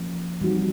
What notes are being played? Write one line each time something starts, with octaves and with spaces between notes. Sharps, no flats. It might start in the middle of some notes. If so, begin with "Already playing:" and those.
Already playing: F3 A#3 C#4
E3 G3 C4 D#4 F#4